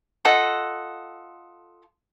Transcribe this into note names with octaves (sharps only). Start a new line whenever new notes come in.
F4 A4 D#5 F#5